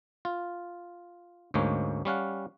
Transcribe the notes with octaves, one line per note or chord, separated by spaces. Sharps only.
F4
D2 G#2 G#3 A#3 C#4
G3 C#4 F5 F#5